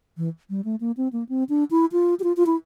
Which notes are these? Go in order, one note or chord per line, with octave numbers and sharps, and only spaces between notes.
E3
G3
A3
A#3
C4
A#3
C4
D4
E4
F4
G4
F4
F4
E4